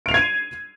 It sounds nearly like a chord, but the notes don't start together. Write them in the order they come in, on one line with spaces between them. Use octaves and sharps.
D7 F7 C7 G#6 D#7